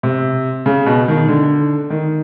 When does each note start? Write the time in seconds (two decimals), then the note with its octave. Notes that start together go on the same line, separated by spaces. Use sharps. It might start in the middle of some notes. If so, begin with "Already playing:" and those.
0.03 C3
0.66 C#3
0.86 B2
1.08 D#3
1.28 D3
1.90 D#3